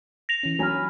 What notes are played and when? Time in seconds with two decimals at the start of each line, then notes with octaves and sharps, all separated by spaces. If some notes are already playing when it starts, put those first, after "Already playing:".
0.29 A#6 F7
0.43 E3 C#4
0.59 F#3 G#5 B5 F6